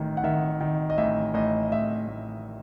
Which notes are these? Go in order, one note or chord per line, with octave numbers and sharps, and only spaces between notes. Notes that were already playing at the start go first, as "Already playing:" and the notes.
Already playing: A1 D#3
F#5
D#3 E5
D#3
D#5
A1 E5
A1 D#5
A1 E5
A1